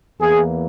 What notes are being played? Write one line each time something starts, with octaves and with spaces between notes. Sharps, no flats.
E2 E3 A#3 G#4